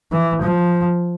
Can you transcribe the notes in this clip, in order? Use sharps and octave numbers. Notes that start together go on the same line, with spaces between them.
E3
F3